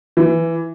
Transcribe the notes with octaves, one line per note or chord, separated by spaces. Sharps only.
E3